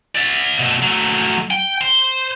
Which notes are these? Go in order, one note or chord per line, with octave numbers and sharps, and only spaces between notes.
D5 E5
B2 A3
F#3 A3
G5
C5